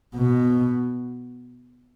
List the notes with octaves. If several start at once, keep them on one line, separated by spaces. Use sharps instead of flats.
B2